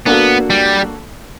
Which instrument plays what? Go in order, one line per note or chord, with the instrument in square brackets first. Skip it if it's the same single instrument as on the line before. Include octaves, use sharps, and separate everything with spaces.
[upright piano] A#3 D4 F#4 A4 [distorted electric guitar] B3
[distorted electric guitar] G3